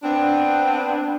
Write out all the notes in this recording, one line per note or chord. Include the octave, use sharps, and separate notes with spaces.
B3 C4 D4